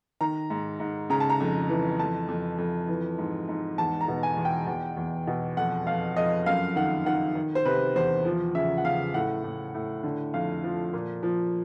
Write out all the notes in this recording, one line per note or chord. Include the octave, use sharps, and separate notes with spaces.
D#3 A#5
G#2
G#2
C#3 A#5
A5
A#5
F2
E3
F2 A5
F2
F2
E3
G#2
G#2
E2 A5
A#5
B2
G#5
E2
G5
E2
E2
B2
F2 F#5
F2 F5
F2 D#5
F#2 F5
D#3 F#5
D#3 F#5
D#3
C5
C3 B4
E2 C5
F3
C#3 E5
F#5
C#3 F5
A2 F#5
A2
A2
D3
F2 F5
F3
A#2
F3